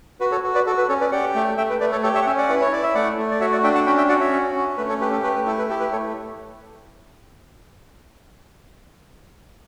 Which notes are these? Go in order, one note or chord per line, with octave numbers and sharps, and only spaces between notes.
F#4 B4
A4 C#5
F#4
B4 D5
F#4 A4
B4
C#4 A4 C#5
B4 D5
G4 D5 F#5
A3
A3 E5 G5
B4
A3 B4 D5
A4 C#5
G4 A4 C#5
C#5 E5
F#5
C#4 C#5 E5
D5 F#5
E4 B4
C#5
E4 D5
E5
A3 D5 F#5
A3
D5
F#4 C#5 E5
D5 F#5
D4 E5 G5
F#5 A5
C#4 G5 B5
E5 G5
F#4 D5 F#5
C#5 E5
C#4
C#4
A3 B4
A4 C#5
G4 B4
A4
A3 B4
B4
E4 A4
B4
G4 A4
B4
A3 A4 C#5